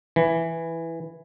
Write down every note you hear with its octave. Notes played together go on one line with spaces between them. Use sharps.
E3